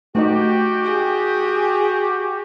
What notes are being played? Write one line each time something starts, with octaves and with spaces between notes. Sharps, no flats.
A3 D#4 F#4 G4 D#5
G#4